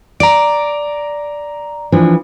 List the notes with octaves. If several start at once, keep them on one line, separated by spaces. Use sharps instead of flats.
D5 A#5 D7
E3 F3 D4